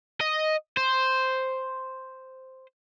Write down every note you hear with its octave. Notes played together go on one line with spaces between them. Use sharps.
D#5
C5